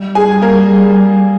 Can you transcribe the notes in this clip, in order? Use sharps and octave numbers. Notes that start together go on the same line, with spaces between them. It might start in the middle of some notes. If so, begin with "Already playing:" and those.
Already playing: G3
G#4 G#5
A#3 A#4